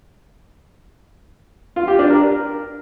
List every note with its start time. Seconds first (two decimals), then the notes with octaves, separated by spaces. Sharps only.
1.76 F4
1.88 G4
1.99 D4
2.10 A#4